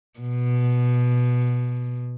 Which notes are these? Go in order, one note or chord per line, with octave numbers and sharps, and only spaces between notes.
B2